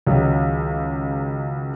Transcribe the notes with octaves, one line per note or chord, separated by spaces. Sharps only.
C#2 D#3 F#3